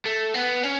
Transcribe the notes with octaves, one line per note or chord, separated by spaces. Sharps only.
A3
B3
C#4